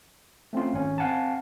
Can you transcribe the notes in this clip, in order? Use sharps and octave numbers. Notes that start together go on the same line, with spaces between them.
A3 C4 C#4 F4
G#1 C#4
C4 F5 F#5 G#5 A5